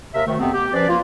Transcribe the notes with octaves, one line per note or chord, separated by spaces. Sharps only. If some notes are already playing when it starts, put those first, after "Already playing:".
D#2 C3 A#4 E5
D2 D#3 A3
F2 C3 B3 C4
G4
F3 C#4 B4 C5 D5
A#3 F4